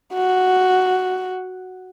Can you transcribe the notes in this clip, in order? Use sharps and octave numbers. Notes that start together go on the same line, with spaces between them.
F#4